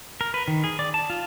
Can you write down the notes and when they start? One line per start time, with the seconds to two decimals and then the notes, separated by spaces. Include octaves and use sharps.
0.21 A#4
0.34 B4
0.48 D#3
0.64 G#4
0.79 D5
0.94 A5
1.10 F4